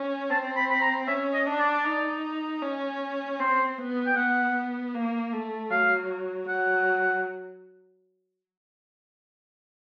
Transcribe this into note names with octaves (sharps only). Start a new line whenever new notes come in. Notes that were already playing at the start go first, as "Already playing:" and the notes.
Already playing: C#4
C4 A5
B5
B5
A#5
C#4 E5
D#5
D4
D5
D#4
C#4
C4 C5
B3
G5
B3 F#5
A#3
A3
F#3 F5
F#3 F#5